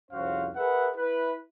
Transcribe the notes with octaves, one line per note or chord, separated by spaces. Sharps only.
C2 F2 C#4 F#4 C5 F5
G#4 A#4 B4 E5 F#5
E4 B4